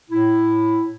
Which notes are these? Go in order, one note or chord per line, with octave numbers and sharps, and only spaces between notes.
A2 E4